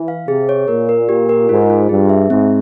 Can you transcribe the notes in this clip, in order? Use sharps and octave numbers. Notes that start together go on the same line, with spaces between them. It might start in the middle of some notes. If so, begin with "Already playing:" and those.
Already playing: E3
F5
C3 G#4
C#5
A#2 A#4
A#4
G4
A#4
G#2 F4
F4
G2 G#4
E5
G#2 C4